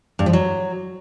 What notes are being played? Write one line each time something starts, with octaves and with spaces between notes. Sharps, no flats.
G2
F3
F#3